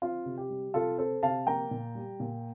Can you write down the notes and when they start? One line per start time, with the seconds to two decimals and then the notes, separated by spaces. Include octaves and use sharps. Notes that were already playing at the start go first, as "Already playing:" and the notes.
0.02 C4 F4
0.25 C3
0.38 G4
0.50 G3
0.74 C3 F4 A4
0.98 C4 A4 C5
1.23 C3 F5 A5
1.47 A#3 G5 A#5
1.71 A#2
1.95 G3
2.20 A#2